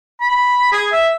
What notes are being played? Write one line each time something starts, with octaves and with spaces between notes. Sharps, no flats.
B5
G#4
E5